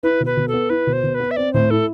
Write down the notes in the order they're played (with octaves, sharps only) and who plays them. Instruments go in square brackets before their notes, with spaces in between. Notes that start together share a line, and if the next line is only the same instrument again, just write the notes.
[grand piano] E4 [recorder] B4
[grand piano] B2
[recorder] B4
[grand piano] B2
[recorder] A4
[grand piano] B3
[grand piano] E4 [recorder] B4
[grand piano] B2
[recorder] C5
[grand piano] B2
[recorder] B4
[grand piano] B3
[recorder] E5
[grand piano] C4 [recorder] D5
[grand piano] A2 [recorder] C5
[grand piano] E4 [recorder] A4